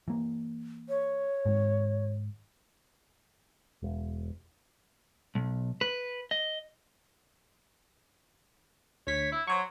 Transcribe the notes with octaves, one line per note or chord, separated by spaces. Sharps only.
E3 A#3
C#5
G#2 D#3
E1
B1
B4
D#5
D2 C#5 B6
E4
F#3 C5 C#5 C#6